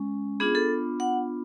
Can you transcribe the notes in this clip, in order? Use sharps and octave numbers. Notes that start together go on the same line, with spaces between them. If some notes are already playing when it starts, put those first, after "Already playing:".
Already playing: G#3 C#4
B3 D4 F4 G#4
A4
F#5